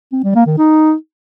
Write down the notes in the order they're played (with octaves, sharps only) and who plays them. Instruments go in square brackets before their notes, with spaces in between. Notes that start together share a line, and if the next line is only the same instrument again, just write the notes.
[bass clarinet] C4
G3
A#3
D#3
D#4